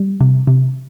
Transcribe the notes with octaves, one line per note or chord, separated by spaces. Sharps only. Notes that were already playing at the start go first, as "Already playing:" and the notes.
Already playing: G3
C3
C3